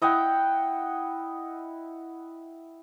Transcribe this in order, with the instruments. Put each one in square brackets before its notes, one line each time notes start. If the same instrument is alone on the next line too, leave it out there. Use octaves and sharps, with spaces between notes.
[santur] E4 D#5 F#5 G5